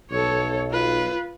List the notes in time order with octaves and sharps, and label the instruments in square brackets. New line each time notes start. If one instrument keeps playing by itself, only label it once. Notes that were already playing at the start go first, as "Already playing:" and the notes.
[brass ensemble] B1 [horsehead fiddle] A4 C#5
[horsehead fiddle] F4 B4